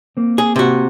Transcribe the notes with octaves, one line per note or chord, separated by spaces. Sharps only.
A#3 C4
G#4
C3 F#4